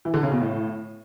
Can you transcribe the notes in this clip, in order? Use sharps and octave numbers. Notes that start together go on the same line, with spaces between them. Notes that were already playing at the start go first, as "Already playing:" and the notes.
E3
D3
C#3
B2
A2